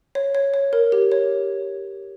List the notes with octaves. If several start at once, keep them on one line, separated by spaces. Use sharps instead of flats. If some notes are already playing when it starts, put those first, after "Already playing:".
C#5
C#5
C#5
A#4
G4
C#5